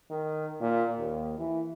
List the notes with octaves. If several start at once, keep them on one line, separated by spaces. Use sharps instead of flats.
D#3
A#2
D#2
E3